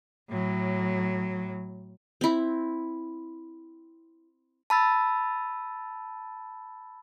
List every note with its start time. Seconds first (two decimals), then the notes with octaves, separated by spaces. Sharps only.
0.30 A2 F#3
2.21 C4 E4
4.70 A5 B5 E6 A6